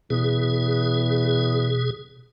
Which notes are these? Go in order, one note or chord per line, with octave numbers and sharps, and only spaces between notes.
E2 B2 G#4